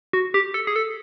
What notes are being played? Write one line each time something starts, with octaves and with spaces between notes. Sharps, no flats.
F#4
G4
A4
G#4
A4